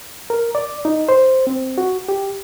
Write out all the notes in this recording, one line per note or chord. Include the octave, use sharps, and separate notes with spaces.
A#4
D5
D#4
C5
C4
F#4
G4